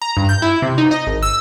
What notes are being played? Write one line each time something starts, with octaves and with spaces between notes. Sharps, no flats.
A#5
G2
G6
E4
C3
D#4
D#5
G#1
E6